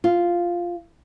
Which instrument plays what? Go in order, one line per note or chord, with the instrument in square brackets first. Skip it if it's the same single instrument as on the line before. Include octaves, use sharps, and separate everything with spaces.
[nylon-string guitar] F4